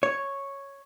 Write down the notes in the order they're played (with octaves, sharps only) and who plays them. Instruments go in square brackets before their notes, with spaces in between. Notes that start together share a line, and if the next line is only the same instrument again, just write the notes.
[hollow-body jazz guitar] C#5